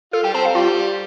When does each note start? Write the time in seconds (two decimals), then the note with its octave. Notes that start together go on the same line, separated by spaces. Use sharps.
0.13 F4 A4
0.23 G3 G4 G5
0.34 C4 C5 A5
0.45 F5
0.55 G3 F4 G4